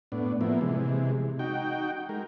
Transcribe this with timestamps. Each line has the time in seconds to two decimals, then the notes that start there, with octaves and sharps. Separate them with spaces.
0.12 A2 B3 D4
0.41 F3 A#3 B3 E4
0.61 C3 E3 G#3
1.39 D#4 F#4 G5
2.09 G#3 A#4